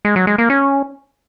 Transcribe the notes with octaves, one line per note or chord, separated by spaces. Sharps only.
G#3
F#3
G#3
A#3
C#4